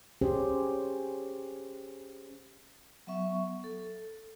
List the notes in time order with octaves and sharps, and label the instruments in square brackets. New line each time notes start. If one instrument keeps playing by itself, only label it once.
[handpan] C#4 G4 G#4 C5
[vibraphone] F#3 B3 E5 C#6
A4